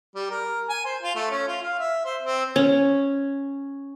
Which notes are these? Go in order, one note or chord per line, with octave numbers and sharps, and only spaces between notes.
G3
A#4
G#5
C5
F4
A3
C#4
F4
F5
E5
C5
C4
C#4